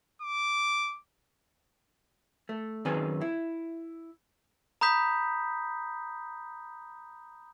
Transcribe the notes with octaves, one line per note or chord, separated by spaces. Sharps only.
D6
A3
F#2 D#3 C4 G#4 B4 G#5
E4
A#5 B5 D#6 G6 B6